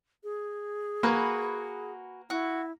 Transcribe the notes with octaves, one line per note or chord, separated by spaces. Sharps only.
G#4
A#3 F#4 B4 G#5
E4 F#4